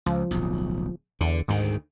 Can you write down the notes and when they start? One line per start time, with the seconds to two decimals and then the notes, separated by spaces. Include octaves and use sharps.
0.06 C#2 F3
0.31 D1 B1
1.21 E2 D3
1.48 D2 G#2 D#3